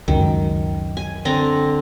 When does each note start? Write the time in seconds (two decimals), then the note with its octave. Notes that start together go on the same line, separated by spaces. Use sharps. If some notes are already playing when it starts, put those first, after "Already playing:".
0.08 C#2 F#2 D#3
0.97 G#5
1.25 D3 C4 A#5